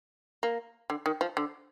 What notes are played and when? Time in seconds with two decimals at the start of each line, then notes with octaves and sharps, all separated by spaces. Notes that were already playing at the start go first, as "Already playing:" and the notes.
0.43 A#3
0.90 D3
1.06 D#3
1.21 F3
1.37 D3